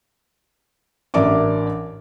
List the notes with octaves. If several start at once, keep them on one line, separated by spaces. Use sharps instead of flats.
A1 D4 A#4 D5 E5 D6